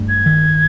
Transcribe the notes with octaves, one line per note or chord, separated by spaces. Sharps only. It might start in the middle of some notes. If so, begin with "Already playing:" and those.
Already playing: G2 A3
G#6
D#3